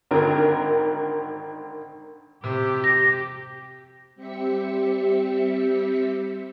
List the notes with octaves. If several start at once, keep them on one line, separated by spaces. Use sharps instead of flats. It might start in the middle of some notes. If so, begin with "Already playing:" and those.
G#1 D3 D#3 A#4
C3 G4
G4 A#6
G3 C4 G4 E5 B6 C#7